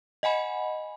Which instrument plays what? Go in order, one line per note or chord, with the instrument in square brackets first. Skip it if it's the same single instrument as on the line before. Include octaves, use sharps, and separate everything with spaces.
[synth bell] D#5 F#5 G#5 B5